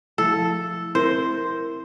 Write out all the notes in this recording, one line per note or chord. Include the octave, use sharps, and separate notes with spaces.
F3 A3 E4 A4
C4 E4 A#4 C5